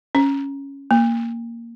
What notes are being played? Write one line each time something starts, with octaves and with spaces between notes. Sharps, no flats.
C#4
A#3